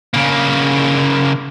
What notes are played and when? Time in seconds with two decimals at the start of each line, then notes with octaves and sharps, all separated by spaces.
0.14 C#3 A#3